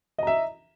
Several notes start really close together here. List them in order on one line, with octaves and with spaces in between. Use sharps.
D#5 A#5 E5